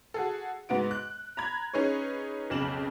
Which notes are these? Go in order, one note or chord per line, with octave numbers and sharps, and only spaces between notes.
F#4 G#4 A4
G#2 B3 F#4 D7
F#6
A#5 B5 G#6
C#4 D#4 G#4 B4 C#5
B1 F2 C#3 E7 F#7